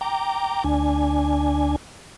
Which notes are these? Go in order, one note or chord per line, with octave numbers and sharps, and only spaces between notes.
G5 A#5 D6
D2 D4 G#5